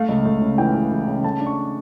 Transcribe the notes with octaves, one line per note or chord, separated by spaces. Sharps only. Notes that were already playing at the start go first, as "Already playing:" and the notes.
Already playing: A3 F5
C#2
A3
C#3
E3 G5
E3
E3
C#3
A3 A5
D4
C#6